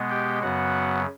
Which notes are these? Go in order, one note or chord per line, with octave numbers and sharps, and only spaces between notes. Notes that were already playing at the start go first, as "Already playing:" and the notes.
Already playing: B2 G#3 B3
G4 G5
F#2 C#3 F#3 B3 F#4 F#5